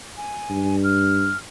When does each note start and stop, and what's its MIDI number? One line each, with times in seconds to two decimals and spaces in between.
0.17 0.76 80
0.50 1.30 43
0.84 1.37 89